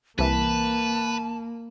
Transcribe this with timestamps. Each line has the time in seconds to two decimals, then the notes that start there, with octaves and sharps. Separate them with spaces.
0.19 C2 E3 A#3 B4 A5